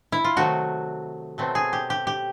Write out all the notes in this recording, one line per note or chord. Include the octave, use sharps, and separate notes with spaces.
E4
F4
C3 D#3 F#3 A3 F#4
B2 F#3 A3 C4
G#4
G4
G4
G4